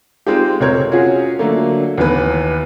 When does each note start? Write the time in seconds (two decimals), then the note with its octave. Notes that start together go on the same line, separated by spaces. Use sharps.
0.27 G#3 C4 D#4 F4 G4
0.61 F1 C4 A#4 C#5 G#6
0.92 C#4 F4 F#4 G#4
1.39 D3 F#3 A3 A#3
1.98 D#2 E3 B3 B4